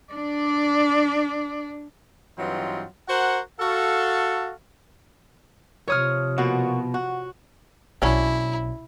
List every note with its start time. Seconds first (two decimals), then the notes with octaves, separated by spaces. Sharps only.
0.13 D4 D5
2.38 G2 E3 F#3 C4 D#4 F4
3.09 F#4 A#4 C5 F#5
3.60 F#4 A4 F5
5.88 C3 F3 C#5 D#6 F6
6.38 B2 A#3 F#4
6.94 F#4
8.02 B1 F#3 C#4 D4 E4